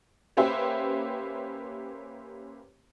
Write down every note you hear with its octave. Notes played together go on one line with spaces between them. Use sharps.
A#3 C#4 G4 B4 C5 E5